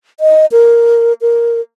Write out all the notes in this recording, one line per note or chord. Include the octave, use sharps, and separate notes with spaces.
D#5
A#4
A#4